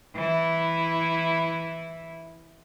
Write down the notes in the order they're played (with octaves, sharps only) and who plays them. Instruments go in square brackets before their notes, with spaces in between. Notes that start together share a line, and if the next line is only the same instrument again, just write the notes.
[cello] E3 E4